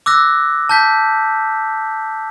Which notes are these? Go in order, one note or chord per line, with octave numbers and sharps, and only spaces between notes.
D6 E6 F#6 A#6
A5 G6 B6